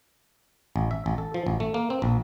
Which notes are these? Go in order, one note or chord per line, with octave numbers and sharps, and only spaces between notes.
A1
E5
A1
A4
F3
A1
A3
A#3
C4
A#1